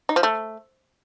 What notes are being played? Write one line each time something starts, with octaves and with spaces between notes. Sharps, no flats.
D#4
F3
A3